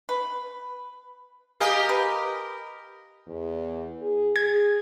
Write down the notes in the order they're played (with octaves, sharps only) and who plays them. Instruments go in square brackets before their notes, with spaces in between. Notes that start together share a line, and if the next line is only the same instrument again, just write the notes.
[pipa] B4
[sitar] G4 A#4 D#5 [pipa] F5 G#5
[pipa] B4
[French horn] E2
G#4
[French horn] G#4 [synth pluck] G#6